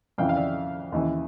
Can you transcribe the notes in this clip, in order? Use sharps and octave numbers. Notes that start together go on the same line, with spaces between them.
F2 C#3 E3 F5 G5
F5
D5 E5
D#2 C#3 E3